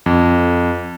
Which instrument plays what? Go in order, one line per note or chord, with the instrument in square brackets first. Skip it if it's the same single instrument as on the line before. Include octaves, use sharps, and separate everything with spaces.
[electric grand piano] F2